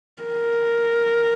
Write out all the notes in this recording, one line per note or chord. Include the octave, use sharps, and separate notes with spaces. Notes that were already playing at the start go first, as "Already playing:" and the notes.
A#4